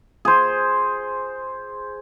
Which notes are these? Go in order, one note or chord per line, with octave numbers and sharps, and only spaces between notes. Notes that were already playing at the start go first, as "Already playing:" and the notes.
G#4 C5